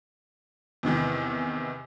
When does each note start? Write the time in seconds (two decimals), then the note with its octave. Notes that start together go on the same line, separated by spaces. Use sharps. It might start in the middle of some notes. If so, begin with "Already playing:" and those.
0.83 E2 C3 D#3 E3